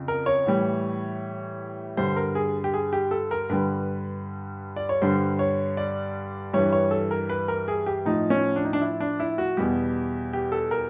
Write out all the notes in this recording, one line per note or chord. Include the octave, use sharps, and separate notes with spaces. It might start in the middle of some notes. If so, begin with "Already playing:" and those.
Already playing: F2 C#3
A#4
C#5
A2 E3 G3
G2 D3 G3 C5
A#4
G#4
G4
G#4
G4
A4
A#4
G2 D3 G3 B4
D5
C#5
G2 D3 G3 C5
C#5
D5
G2 E3 G3 C#5
C#5
A4
A#4
B4
A#4
G#4
G4
A2 F3 D#4
C#4
D4
D#4
D4
E4
D4
E4
F#4
E2 B2 G3 G4
G4
A4
A#4